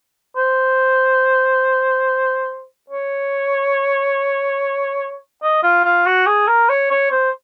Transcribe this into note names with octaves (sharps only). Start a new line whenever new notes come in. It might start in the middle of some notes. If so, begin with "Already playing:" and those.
C5
C#5
D#5
F4
F4
F#4
G#4
A#4
C#5
C#5
C5